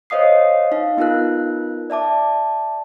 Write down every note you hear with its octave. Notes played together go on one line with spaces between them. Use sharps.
C5 C#5 D#5 F5 D#6 C7
D#4 F5
B3 D#4 F4 A#4 F#6
D5 E5 A5 D6